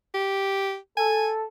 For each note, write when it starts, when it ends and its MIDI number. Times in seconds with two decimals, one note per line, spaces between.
0.14 0.76 67
0.97 1.44 69
0.97 1.29 80